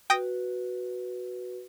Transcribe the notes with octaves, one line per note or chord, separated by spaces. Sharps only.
F#4 B4 G5 D#6 A#6